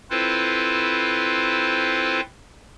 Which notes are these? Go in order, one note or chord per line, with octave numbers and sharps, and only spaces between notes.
C4 E4 F4 A4 B4 C5